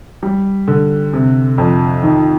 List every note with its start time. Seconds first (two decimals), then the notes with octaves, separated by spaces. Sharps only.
0.23 G3
0.68 D3
1.13 C3
1.58 F2
2.03 D#3